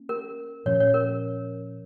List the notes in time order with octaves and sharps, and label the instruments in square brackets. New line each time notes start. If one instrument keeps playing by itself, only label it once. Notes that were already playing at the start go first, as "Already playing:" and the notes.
Already playing: [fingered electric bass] A#3 C#4
[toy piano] A#4
[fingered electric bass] A#2 F3 C#4 [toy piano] C#5
[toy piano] C#5
A#4